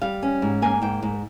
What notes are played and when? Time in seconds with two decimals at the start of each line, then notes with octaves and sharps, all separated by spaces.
0.02 G3 F5
0.23 C#4
0.42 G#2
0.62 A#3 G#5
0.82 G#2 G5
1.03 G#2